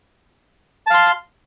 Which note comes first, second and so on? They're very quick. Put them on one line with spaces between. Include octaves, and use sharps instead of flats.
A5 F5 C6